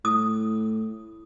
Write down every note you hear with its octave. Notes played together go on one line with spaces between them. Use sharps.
A2 D#6